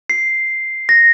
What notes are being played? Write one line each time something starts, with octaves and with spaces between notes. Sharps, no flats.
C7
A#6